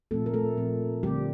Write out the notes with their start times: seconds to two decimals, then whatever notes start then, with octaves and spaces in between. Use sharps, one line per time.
0.11 A#2 F3 A3 C4 A4
0.26 A#4
0.34 A3 A4
0.57 A#2 F3 C4
1.03 D3 F3 G3 A3 C4 G4